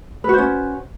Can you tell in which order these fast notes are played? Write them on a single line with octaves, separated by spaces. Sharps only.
B4 F#4 C5 C#4